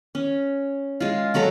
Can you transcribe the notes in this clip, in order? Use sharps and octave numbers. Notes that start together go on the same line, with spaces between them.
C#4
G#3 F4
F#3 F#4 A4 A#5